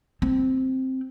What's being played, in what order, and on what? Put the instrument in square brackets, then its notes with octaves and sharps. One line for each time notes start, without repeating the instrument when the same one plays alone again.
[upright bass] C4